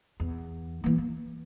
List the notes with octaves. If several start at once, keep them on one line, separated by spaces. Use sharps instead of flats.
E2
E3 A#3
A#3